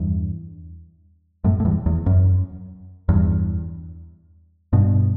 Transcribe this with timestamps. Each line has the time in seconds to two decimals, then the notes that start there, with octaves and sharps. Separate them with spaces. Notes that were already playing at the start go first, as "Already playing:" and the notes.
Already playing: E2 G2
1.44 F#2 A2
1.60 A2
1.65 E2 G2
1.86 E2
2.06 F#2
3.09 E2 G2
4.73 G2 B2